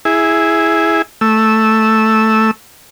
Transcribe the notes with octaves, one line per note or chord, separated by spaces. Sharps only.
E4 G#4
A3 E6